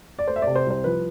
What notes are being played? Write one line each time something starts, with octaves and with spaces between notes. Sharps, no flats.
D5
A3 C5
E5
C3 D5
C5
C2 C5
F3 B4